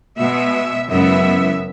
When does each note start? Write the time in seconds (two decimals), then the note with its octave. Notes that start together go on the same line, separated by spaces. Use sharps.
0.17 B2 G#3 B3 E5
0.88 F#2 C#3 E3 G#3 B3 E5